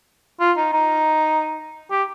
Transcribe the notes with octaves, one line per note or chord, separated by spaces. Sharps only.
F4
D#4
D#4
G4